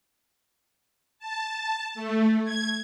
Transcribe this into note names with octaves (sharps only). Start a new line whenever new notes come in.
A5
A3
G#6